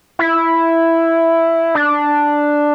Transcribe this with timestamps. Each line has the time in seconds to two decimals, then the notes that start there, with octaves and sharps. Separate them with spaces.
0.19 E4
1.75 D4